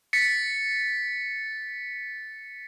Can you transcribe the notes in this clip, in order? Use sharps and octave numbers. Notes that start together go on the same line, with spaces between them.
A6 B6 C#7